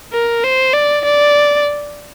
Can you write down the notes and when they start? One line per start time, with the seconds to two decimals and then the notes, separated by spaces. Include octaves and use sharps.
0.13 A#4
0.44 C5
0.74 D5
1.05 D5